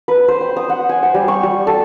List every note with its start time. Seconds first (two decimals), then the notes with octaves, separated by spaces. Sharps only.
0.08 B4
0.28 C5
0.41 G5
0.56 D#6
0.70 F#5
0.89 G#5
1.03 C5
1.14 G3
1.28 C#6
1.43 G3
1.67 A4